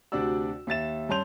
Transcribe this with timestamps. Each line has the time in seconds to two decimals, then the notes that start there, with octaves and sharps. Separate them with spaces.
0.12 D2 C3 D4 F#4 D5 E6
0.67 D#2 E5 A6 E7
1.09 G2 C#4 A5 C6 G6 F7